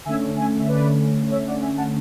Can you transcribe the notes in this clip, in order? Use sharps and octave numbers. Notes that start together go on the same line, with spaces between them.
D3 A3 C#4 E5 G#5
E5 G#5
E5
B4 D5
C#5 E5
D5 F#5
E5 G#5
F#5 A5